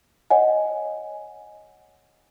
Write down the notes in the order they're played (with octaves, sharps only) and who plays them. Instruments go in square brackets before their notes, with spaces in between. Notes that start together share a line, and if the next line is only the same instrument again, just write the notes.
[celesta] C#5 D#5 F#5 G#5